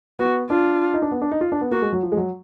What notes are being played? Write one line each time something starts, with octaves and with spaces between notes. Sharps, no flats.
B3 F#4
D4 F4
D#4
D4
B3
D4
D#4
F4
D4
B3
A#3 F#4
G#3
F#3
F3
G#3
F#3